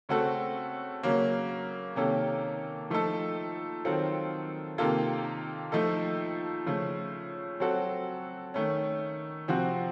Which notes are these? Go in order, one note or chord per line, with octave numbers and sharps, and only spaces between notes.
C#3 A3 C4 F#4 A4
C#3 F#3 A#3 C#4
C3 D#3 A#3 C#4 A4
F3 A3 D#4 A4
D#3 F#3 C4 F4 A4
C3 D#3 A#3 F4 A4
F3 A3 D#4 A4
C#3 F3 A3
F#3 C4 F#4 A4
D#3 A3 C#4
C3 F3 C4 F#4